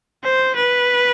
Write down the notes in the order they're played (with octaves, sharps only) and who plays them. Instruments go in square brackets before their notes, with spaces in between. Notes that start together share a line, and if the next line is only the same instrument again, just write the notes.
[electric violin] C5
B4